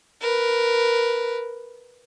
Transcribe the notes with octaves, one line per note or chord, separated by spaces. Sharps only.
A#4 B4